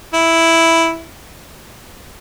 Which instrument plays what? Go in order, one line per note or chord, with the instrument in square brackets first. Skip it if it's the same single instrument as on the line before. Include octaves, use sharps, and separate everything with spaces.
[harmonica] E4